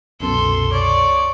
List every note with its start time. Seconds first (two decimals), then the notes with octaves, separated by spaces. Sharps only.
0.20 C2 F#2 B2 A4 C6
0.72 C#5 D5